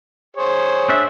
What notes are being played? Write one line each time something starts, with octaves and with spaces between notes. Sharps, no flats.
G#4 C5 C#5
C4 D4 E5